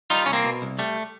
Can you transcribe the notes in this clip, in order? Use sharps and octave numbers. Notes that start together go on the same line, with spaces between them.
G3 D#4 F4
C2 C#4
A#3 C4
B2
C2
G3 A3